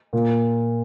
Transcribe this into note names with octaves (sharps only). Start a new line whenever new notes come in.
A#2